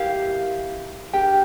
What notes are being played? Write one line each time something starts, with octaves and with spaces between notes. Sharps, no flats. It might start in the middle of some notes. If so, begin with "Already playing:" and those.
Already playing: E4 G4 A#4 F5
D4 G4 A#4 G5